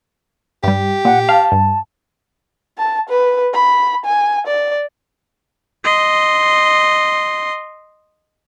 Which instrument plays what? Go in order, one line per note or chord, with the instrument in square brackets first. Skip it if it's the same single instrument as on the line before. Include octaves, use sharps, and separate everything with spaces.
[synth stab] G2 G3 [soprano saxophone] G4
[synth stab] A#2 [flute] F#5
[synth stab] F5 [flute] A5
[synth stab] G2
[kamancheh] A5
B4
B5
G#5
D5
[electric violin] D#5 C6